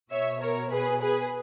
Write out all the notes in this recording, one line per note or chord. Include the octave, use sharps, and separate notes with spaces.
B2 C#5 E5
A#4 C#5
G#4 B4
G#4 B4